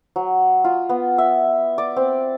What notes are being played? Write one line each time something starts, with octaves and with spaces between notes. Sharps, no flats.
F#3
F4
B3
E5
D5
C4